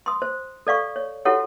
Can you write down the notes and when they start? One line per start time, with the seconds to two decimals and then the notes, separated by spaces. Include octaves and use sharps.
0.06 C6 D#6
0.22 C5
0.67 A4 D5 F5 C#6
0.96 C#5
1.25 E4 F#4 G4 A4 C#5 F#5